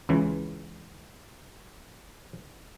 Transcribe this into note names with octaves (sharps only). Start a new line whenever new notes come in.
C#2 C#3 E3